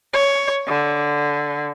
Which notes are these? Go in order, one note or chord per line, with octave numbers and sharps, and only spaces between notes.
C#5
D3